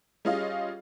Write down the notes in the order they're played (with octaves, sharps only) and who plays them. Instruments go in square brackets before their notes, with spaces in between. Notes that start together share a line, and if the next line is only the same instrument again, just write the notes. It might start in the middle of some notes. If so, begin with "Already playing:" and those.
[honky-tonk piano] G3 C#4 F4 G#4 D#5 F5